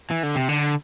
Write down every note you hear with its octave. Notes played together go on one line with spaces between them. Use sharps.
E3
D3
C3
D3